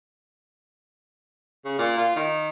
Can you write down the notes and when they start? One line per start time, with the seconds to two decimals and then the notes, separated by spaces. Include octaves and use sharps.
1.65 C#3
1.79 A#2
1.98 F4
2.16 D#3